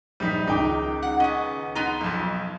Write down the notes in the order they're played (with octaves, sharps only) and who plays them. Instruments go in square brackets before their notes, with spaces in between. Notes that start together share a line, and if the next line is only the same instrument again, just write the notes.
[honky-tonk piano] A#1 B6 [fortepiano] G3 D#4
[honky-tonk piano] C#2 D#3 D6 [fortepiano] D#4 G5
[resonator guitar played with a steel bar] F#5
[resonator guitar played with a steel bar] B3 C#4 [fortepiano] D#5
[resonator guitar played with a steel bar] B3 D#4 F4 [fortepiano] A#5
[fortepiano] B1 F2